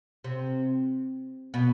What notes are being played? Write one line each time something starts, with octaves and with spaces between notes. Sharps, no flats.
C3
B2